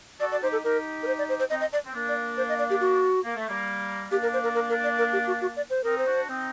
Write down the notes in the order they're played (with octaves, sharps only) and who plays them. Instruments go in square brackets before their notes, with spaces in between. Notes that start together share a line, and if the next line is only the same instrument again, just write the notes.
[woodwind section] F#4 A4 [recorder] D5
[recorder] D5
[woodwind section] D#4 G4 [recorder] C5
[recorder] A4
[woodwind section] D#4 G4 [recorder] A#4
[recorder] A#4
C5
D5
C5
C5
[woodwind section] C4 D#4 [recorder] D#5
[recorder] D#5
D5
[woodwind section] C4
A#3 D4
[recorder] D5
C5
D#5
D5
G4
F#4
[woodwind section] A#3
A3
G3 A#3
[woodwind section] A#3 D4 [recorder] G4
[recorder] A#4
C5
A#4
A#4
A#4
D5
A#4
G4
F#4
F#4
D5
C5
[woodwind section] C4 D#4 [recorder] A#4
[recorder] C5
[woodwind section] D4 F#4
C4 D#4